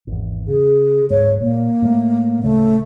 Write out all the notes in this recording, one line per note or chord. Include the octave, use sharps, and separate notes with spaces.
G#1 E2
C#3 G#4
D1 G#2 C#5
A#2 A#3
A2 A3
D1 C#3 A3